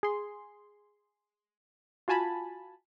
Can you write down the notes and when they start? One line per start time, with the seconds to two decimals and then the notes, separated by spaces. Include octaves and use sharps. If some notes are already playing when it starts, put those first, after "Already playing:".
0.03 G#4 C6
2.08 F4 F#4 G#5 A5 B5